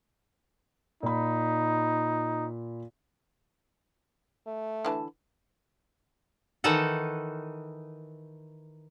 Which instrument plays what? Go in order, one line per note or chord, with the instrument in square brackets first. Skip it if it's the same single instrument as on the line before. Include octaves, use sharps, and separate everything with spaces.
[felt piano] A#2 B5 [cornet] D#4
[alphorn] A3
[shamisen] D3 E3 A5
[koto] D#3 E3 D#4 A4 F#5